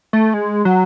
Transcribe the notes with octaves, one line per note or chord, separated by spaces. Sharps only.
A3
G#3
F#3